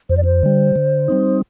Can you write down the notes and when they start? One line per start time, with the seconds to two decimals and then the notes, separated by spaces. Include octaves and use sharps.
0.09 F2 C5
0.17 D5
0.25 C5
0.43 D3 G3
0.76 D3
1.08 G3 C4 D#4